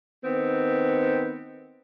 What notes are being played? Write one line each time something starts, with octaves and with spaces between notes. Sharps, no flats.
D#3 B3 C4